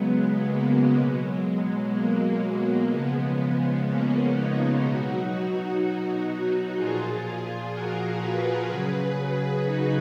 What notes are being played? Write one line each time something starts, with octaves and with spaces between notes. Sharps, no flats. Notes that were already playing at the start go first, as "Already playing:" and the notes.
Already playing: C#3 F#3 G#3 B3
A#3
B2 F#3 G#3
A#3
C#3 F3 G#3 B3
A#3 C#4
B3 D#4
B2 F#3 D#4 F#4
A#2 F3 F4 G#4
F#4 A#4
G#4 B4
C#3 F#3 G#4 B4
D#4 F#4